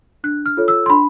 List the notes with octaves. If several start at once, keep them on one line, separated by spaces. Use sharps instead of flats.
D4 F#6
F6
F4 A4 C#5
E6
C6
D4 B5